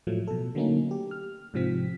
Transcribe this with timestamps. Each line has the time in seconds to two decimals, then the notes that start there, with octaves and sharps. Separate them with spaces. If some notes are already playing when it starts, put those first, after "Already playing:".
0.07 A2 F3 F#3 A3
0.27 B2 A4
0.55 D3 F#3 A3 A#3 C#4 D#4
0.91 G4
1.11 F6
1.54 G#2 C3 F3 C4 B6